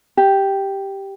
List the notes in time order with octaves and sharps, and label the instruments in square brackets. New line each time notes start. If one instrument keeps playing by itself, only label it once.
[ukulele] G4